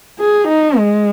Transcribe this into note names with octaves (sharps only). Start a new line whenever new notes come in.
G#4
D#4
G#3